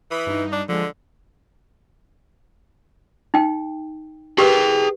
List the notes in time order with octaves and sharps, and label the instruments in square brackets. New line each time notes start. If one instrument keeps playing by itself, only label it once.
[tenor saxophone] E3 [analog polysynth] B5 D#6
[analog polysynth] G2 D#4
[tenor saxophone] D4
[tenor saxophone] D3 [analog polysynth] F3 G#3
[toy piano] D#4 G5
[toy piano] G4 A#4 B4 [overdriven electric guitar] G#4 G5